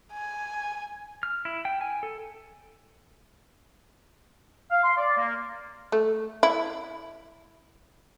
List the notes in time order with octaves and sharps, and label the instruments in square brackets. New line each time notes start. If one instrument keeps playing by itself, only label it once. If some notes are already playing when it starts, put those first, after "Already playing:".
[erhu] G#5
[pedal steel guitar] F6
E4
G5
G#5
A4
[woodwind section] F5
C6
D5
A#3
[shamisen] A3
E4